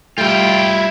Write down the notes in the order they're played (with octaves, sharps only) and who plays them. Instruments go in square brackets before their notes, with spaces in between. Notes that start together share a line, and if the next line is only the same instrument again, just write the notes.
[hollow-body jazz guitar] G3 A3 [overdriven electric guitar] E4 F4 [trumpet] G5